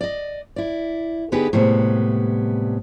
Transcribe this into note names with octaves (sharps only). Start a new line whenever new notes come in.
D5 D#5
E4 D5
D3 B3 D#4 G4 G#4 B4
A2 C3 G3 G#3 B3